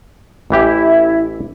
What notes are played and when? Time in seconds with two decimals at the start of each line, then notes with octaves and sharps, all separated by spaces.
0.50 A1 E3 E4 G4